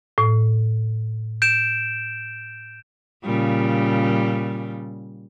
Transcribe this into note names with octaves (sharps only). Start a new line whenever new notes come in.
A2
G6 D7 E7
A#2 C#3 G3